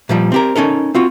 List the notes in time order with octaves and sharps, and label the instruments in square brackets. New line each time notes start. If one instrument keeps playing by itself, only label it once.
[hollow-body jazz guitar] A#2 F3 G3
C4 G4 A#4
C#4 D#4 A4 A#4
C4 F4 F#4